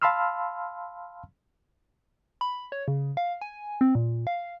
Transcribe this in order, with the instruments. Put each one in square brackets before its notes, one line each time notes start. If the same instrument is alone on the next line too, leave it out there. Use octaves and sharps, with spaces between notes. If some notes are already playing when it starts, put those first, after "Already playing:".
[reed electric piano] F5 A5 B5 C6 E6 F6
[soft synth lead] B5
C#5
C#3
F5
G#5
C4
A#2
F5